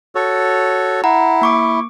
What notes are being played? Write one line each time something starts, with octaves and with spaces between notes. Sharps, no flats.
F#4 A4 C#5
E4 F#5 A#5
A#3 C#6 D6